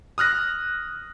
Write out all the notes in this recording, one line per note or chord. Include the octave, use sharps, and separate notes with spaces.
D#6 F6 F#6 A#6